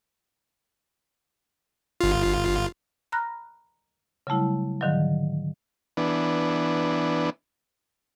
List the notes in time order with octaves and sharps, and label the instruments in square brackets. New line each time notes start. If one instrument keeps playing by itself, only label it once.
[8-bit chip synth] G1 F4
[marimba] A#5 B5 F6 F#6 A#6
C#3 F#3 G3 A3 E4
G#2 D3 D#3 F3 F#3
[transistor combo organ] E3 B3 D4